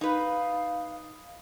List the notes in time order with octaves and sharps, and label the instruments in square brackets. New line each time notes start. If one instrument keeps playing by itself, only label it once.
[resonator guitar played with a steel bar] D#4 B4 [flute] F5